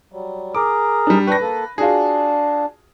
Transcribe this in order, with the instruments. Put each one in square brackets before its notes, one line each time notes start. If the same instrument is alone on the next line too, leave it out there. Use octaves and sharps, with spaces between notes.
[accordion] F#3 G3
[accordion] G#4 A#4 [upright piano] D6
[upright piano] G3 D4
[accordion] D4 G5 C#6 [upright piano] B4 A#6
[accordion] A#3 A4
[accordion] D4 [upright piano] F4 F#4 G#4